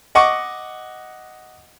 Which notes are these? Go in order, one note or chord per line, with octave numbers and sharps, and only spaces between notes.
D#5 F#5 C#6 D6